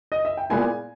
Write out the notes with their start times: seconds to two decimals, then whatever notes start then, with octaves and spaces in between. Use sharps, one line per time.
0.12 D#5
0.25 E5
0.37 G5
0.50 A#2 G#3 B3 E4 G#5